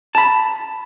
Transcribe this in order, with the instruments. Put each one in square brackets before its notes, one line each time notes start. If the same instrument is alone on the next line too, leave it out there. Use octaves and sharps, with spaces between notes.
[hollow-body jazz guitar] A5 B5